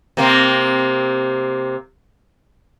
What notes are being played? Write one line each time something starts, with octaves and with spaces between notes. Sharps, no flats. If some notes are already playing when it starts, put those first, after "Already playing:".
C3 A#3 C4